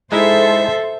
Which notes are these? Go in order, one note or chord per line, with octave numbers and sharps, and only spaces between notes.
G#3 D#4 E4 A4 C5 E5